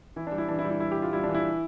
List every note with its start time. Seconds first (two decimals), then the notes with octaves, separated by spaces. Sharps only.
0.16 E3 E4
0.27 D4
0.32 G3
0.38 E4
0.49 E3 D4
0.59 E4
0.64 G3
0.70 E4
0.80 G3 E4
0.92 G4
0.97 G3 F4
1.13 G3 E4
1.24 D4
1.29 E3
1.34 E4